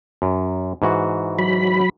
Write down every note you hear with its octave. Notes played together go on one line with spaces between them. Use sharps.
F#2
G#2 E3 F#4
F#3 B5